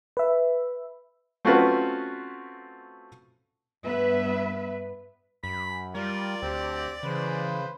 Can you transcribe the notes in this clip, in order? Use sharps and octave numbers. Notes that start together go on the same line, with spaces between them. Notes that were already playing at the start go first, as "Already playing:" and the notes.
B4 E5
A3 C4 C#4 F4 F#4 B4
G2 B3 B4 E5
F#2 B5
G3 F4 A#4 D5
D2 C4 G4
C#3 E3 G#3 B4 C5